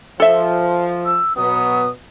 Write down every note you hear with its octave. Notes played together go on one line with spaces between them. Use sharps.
F3 A4 E5
E6
B2 F#3 B3 D#6